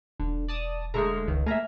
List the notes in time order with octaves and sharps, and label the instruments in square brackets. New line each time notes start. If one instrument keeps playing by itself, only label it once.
[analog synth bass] E1 [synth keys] D3
[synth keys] D5 A5 D#6
[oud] D3 G#3 A3 [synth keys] A#5 C#6 F6
[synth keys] C#2 D#3
[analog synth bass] A3 [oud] A#3 E5 [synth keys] G#5 A#5